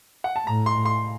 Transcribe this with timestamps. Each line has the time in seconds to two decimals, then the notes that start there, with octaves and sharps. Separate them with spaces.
0.24 F#5
0.36 A5
0.47 A2 A#5
0.66 C6
0.85 C6